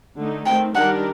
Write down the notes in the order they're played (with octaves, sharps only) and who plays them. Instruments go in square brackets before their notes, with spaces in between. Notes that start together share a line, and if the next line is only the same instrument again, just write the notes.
[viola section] D3 A3 D#4
[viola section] D#3 A3 C4 [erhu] G5
[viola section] D#3 G3 D4 G4 A#4 [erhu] F#5